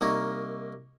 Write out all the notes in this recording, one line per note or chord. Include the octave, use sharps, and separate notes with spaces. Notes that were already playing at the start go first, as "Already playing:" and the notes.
C2 A#3 D#4 A#4 C#5